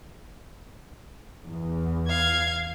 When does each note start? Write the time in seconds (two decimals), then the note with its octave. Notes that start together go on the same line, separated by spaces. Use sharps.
1.47 E2
2.08 F5 G#6